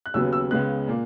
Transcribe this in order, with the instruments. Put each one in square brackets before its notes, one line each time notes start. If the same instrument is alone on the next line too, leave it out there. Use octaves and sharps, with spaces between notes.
[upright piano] F#6
D#2 C#3 F#3 B3 E6
E6
C#2 C#3 G#3 B3 F#6
A#2 A#3